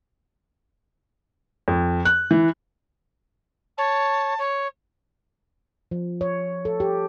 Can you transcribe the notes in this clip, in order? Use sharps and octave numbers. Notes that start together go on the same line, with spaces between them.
F2
F#6
E3
C#5 A5
C#5
F3
C#5
A4
G4